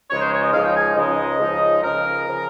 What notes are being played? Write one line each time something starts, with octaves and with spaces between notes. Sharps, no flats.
C#2 C#3 F3 G#3 D#4 C#5
C5
C#5
D#5
C#2 C#3 F3 G#3 D#4 F5
G5
G#5
C#2 C#3 F3 G#3 D#4 D#5
C#2 C#3 F3 G#3 D#4
C#2 C#3 F3 A#4
C#3 F3